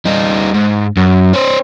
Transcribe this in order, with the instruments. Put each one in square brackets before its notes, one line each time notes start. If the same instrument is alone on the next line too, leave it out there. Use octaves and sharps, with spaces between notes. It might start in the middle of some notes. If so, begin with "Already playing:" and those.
[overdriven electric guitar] G3 D#4
G#2
F#2
C#4 C5